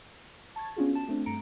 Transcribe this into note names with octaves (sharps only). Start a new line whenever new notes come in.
A5 C#6 G#6 A6
B3 C#4 D4 F4 F#4 G#4
A5 E7
A3 C4 D4
G2 A3 A#5 C#7 D7